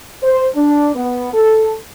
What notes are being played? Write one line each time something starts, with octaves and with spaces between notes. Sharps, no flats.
C5
D4
B3
A4